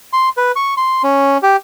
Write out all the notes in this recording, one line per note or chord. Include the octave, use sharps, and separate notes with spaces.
C6
B4
C#6
C6
C#4
G4